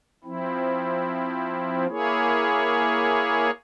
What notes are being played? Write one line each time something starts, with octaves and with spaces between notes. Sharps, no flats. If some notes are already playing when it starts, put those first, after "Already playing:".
F3 C4 E4
A#3 E4 G#4 C#5